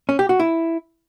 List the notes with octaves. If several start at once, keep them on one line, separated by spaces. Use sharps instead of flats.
C#4
G4
F#4
E4